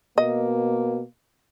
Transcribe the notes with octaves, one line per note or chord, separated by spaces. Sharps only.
B2 A#3 D#5